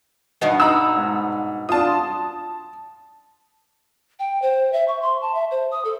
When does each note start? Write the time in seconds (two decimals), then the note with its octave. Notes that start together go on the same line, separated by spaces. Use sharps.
0.41 G2 B2 B3 D#4
0.60 D#4 A#5 B5 E6
0.97 G#2
1.69 D4 F4 A5 D#6
1.85 C6
4.19 G5
4.42 C5
4.73 E5
4.88 C#6
5.02 C6
5.22 A5
5.35 E5
5.51 C5
5.71 D#6
5.85 A4